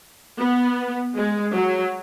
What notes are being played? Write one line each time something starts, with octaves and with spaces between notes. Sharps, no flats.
B3
G#3
F#3